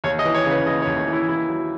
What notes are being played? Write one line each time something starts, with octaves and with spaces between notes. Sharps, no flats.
D#2 C#5
D#5
E3
C#5
C#3
B4
D#2 D#5
C#5
D#2
C#5
E3
E4
D#2 E4
F#3